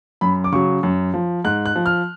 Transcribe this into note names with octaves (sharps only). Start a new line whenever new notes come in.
F#2 B5
D6
C#3 F#3 C#6
F#2
F3
G#2 F#6
F#6
F3
F6